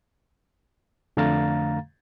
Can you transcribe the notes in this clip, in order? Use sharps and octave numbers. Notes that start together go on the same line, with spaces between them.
F2 D3 A3 F5 A#5 A6